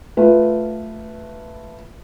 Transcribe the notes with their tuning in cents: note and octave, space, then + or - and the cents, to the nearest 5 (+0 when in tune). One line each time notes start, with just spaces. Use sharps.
A3 +0 F4 +0 B4 +0